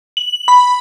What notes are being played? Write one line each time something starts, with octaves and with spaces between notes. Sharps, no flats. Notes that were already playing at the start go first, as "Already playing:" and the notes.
F#7
B5